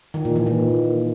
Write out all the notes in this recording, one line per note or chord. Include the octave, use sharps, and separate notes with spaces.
D#3
A#2
E3
A#2